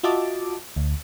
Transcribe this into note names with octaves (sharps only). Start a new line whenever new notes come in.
F4 F#4 D#5 E5 A5 D6
D2